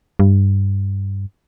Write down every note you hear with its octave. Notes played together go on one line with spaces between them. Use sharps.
G2